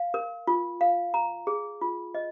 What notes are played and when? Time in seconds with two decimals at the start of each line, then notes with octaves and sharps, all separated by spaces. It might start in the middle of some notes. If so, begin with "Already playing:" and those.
Already playing: F5
0.14 A#4
0.47 F4
0.81 F5
1.14 A#5
1.47 G#4
1.81 F4
2.14 D#5